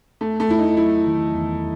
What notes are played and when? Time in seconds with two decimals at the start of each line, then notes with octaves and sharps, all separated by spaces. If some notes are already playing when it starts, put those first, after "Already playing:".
0.21 E2 A3
0.40 A3
0.49 E2 E4
0.59 D#4
0.77 F#3 E4
1.06 D#3
1.34 E2